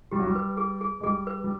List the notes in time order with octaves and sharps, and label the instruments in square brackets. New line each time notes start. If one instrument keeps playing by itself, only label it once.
[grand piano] G3 [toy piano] G4
[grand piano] F#3
G3
[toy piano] B4
G#4
G#4
[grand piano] G#3
[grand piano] G3 [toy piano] G#4
[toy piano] B4
[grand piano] G3